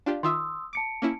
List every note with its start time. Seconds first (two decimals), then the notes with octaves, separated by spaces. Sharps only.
0.06 D4 F4 G4 D5 F5
0.23 D#3 F4 E5 C6 D#6 E6
0.73 A5 D6 C#7 D7
1.02 A#3 C#4 E4